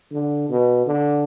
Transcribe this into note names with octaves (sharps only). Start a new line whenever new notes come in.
D3
B2
D3